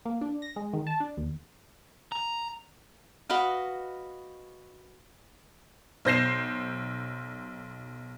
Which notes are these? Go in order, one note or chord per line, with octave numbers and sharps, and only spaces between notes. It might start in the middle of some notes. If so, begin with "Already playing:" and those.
A#3
D4
A#6
G#3
D#3
A5
D4
D#2
A#5
F#4 B4 D#5 F5
B1 C5 G6 A#6 C7 E7